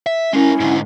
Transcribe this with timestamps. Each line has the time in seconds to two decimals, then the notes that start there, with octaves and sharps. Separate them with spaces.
0.06 E5
0.33 G#3 C#4 E4 A#4
0.60 G#2 D3